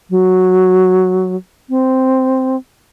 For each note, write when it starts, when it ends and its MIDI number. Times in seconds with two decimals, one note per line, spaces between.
0.10 1.36 54
1.70 2.56 60